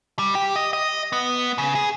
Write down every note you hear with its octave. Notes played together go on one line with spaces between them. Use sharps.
G3
G4
D#5
D#5
B3
C#3
G#4